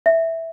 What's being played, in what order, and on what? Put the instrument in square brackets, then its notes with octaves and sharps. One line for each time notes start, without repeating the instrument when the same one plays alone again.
[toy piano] E5